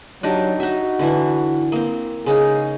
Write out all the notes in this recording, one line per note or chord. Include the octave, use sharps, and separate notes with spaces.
F#3 D4 D#4 G4
D#4 F#4 E5
D3 E3 E4
A#3 C4
C#3 C#4 D#4 G#4